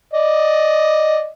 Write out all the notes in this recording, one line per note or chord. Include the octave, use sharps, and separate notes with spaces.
D5 D#5